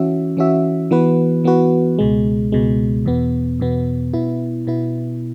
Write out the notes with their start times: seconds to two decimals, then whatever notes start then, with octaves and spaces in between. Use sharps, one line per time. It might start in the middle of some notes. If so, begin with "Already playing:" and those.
Already playing: E3 C#4 F#4 E5
0.37 E3 C#4 F#4 E5
0.91 E3 B3 F#4 B4
1.44 E3 B3 F#4 B4
1.99 C#2 B2 G#3
2.52 C#2 B2 G#3
3.05 E2 B2 B3
3.60 E2 B2 B3
4.13 B2 B3 E4
4.67 B2 B3 E4